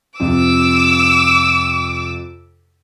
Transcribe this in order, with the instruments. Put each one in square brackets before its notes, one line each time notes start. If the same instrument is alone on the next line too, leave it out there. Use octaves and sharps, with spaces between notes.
[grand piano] F2 C3 [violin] D6 E6